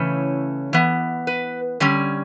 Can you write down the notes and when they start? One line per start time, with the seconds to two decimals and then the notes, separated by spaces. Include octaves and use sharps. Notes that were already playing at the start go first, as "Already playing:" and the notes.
Already playing: C#3 E3 A3 C#4
0.73 E3 B3
1.27 B4
1.80 D3 G3 C#4